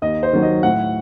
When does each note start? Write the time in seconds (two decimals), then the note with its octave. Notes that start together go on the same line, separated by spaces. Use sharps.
0.02 D#2 D#5
0.23 C5
0.33 D#3 F#3
0.42 D#5
0.63 A2 F#5